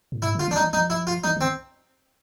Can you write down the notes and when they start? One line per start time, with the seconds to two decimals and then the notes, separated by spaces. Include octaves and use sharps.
0.12 A2
0.22 G#2 E4
0.35 D3 F4
0.48 E3 D4
0.56 D#4
0.61 E3
0.73 F3 D#4
0.90 E4
1.07 F4
1.24 E3 D#4
1.37 D#3
1.41 C4